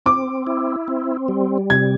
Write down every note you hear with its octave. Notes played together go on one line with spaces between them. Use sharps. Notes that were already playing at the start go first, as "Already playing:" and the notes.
C4 D6
E4
C4
G3
C3 G#6